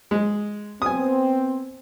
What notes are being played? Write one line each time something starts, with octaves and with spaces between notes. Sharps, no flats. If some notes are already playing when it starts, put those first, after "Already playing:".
G#3
B3 C4 G#5 D#6